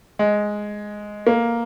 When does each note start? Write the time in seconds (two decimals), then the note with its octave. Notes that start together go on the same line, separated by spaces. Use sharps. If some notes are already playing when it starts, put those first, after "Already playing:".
0.19 G#3
1.27 A#3